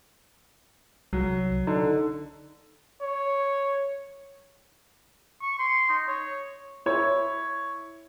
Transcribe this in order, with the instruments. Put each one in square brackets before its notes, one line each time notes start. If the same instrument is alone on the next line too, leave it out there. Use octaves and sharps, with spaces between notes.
[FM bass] C2 [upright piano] F#3
[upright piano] D3 [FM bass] D#4
[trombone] C#5
[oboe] C#6
C6
D#4
C#5
[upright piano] E4 C#5